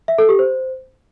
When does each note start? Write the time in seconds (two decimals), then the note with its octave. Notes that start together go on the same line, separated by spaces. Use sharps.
0.08 E5
0.18 A4
0.29 G4
0.39 C5